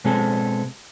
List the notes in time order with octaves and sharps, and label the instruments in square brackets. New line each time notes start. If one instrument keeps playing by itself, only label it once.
[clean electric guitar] B2 G#3 C4 G#4 A4